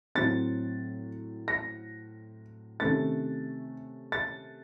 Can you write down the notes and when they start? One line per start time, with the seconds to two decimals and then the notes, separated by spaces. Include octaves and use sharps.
0.15 A2 F#3 C4 A6
1.48 A#6
2.80 C3 D#3 A3 C#4 A6
4.12 A6